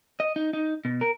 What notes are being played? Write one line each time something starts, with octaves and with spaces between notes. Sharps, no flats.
D#5
D#4
D#4
B2
A#4